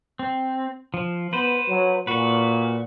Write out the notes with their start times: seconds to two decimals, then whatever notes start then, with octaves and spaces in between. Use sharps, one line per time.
0.19 C4
0.94 F3
1.33 B3 B4 C5
1.68 F#3
2.07 A#2 F#4 B4